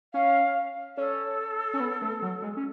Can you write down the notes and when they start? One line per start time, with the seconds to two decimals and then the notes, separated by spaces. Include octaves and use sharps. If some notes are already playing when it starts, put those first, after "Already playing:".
0.13 C#4 F5
0.97 C#4 A4
1.74 C#4
1.80 B3
2.02 A3
2.22 F#3
2.42 G#3
2.57 C#4